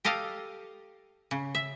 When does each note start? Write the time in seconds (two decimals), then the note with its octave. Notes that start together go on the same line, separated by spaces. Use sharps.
0.05 G4 A4 D#5 F5
1.31 C#3
1.55 E5